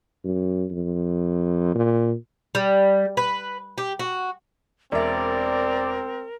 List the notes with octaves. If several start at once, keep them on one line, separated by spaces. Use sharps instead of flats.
F#2
F2
A#2
G3
B4
G4
F#4
E1 C4 A#4 D5 E5